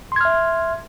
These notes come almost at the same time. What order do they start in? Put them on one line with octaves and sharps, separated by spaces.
C6 G#6 F6 E5